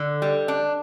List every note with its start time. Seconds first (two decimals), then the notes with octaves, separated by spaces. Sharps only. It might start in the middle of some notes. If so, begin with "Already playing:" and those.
Already playing: D3
0.22 G3
0.48 D4